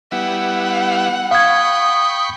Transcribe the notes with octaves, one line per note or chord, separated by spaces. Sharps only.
G3 B3 E4 F#5
F5 G5 B5 C#6 D#6 G#6